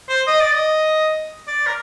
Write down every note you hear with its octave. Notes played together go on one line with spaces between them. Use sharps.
C5
D#5
D5
D#5
D5
A#4